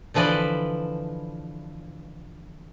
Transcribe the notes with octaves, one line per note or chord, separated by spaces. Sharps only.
D3 E3 F3 B4 D5 D#5